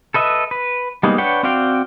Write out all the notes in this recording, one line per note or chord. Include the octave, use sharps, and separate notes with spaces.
A4 B4 D#5 E5
B4
G3 G#3 A#3 B3 D#4
D4 B4 C#5 F#5 G5
C4 F#4 D5 F5 G5